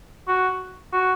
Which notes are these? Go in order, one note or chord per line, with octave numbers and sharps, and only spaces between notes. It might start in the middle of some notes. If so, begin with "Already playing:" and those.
F#4
F#4